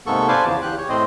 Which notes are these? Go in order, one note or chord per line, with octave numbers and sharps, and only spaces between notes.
G#2 C3 A#3 B3 A4 C#6
B4 C5 D5 F5 G#5 A5
E2 C#3 F3
E2 G4 F#6
C#5
A2 C4 C5 D#5